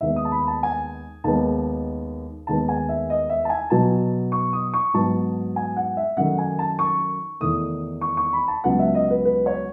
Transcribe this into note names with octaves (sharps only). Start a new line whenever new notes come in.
D#2 D#3 G#3 B3 E5
D#6
A5
B5
A5
G#5
D#2 D#3 G#3 B3 A5
D#2 D#3 G#3 B3 A5
G#5
E5
D#5
E5
A5
G#5
B2 F#3 B3 A5
C#6
D#6
C#6
G#2 F#3 B3 A5
G#5
F#5
E5
F#2 D#3 A3 F#5
G#5
A5
C#6
E2 D#3 A3 D#6
C#6
C#6
B5
A5
C#2 C#3 F#3 B3 F#5
E5
D#5
B4
B4
C#5